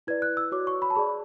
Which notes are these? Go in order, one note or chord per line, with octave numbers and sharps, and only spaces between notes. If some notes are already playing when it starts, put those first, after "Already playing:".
E4 B4 D5 G#6
F#6
E6
F#4 C#5 D6
C#6
B5
A5
G#4 D5 B5